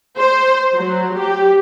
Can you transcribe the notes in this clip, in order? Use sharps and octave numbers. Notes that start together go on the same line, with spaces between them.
C5
F#3
G4